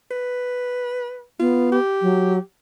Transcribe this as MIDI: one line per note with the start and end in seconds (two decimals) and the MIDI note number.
0.11 1.23 71
1.40 1.78 59
1.40 1.68 65
1.72 2.40 67
2.02 2.38 54